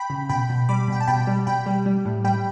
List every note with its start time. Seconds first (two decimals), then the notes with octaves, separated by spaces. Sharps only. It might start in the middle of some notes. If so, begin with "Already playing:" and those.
Already playing: G5 B5
0.10 C#3
0.29 B2 G5 B5
0.49 B2
0.69 G3 B5 D6
0.88 B2 G5
1.00 A5
1.07 B2 G5 B5
1.27 G3
1.47 B2 G5 B5
1.66 G3
1.86 G3
2.05 A2
2.24 G3 G5 B5